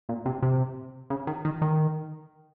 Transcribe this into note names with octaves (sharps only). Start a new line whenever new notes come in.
A#2
C3
C3
C#3
D#3
D#3
D#3